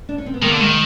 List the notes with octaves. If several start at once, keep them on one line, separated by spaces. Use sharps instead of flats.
D4
C#4
C4
B3
D#3 G#3 A#3
D3
D#3 G#3